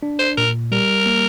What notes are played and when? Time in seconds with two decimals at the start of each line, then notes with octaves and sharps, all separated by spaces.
0.03 D4
0.19 C5
0.38 A#2 A#4
0.72 G3 A#4
1.06 A#3